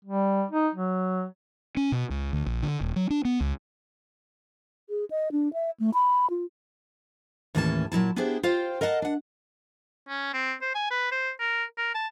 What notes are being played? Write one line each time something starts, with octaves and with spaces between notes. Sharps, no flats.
G3
D#4
F#3
C#4
B2
C#2
D2
A#1
D3
D#1
F#3
D4
B3
C#2
G#4
D#5
D4
E5
A3
B5
F4
D#2 A2 E3 C#4 G4 A5
A#2 F#3 E4 A5
B3 D4 E4 G4 G#4 C5
F4 C5 F5 G5
A#4 D#5 F5 F#5 A5
D4 F#5
C#4
C4
C5
G#5
B4
C5
A#4
A#4
A5